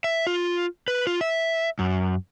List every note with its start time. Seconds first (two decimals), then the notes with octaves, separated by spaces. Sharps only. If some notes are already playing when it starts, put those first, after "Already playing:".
0.04 E5
0.27 F4
0.88 B4
1.07 F4
1.21 E5
1.79 F#2